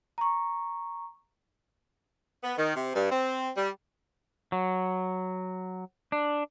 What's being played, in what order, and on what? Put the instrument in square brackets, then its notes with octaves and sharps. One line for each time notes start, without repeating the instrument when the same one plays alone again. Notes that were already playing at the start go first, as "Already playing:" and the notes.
[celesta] A#5 C#6
[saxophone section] B3
D#3
C3
G2
C4
G3
[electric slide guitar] F#3
D4